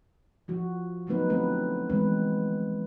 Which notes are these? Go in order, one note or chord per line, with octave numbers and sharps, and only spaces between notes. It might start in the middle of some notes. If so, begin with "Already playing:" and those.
F3 F#4
F3 F#3 A3 B3 D#4 B4
D3 F#3 A3 C4 B4
E3 G#3 B3 C4 B4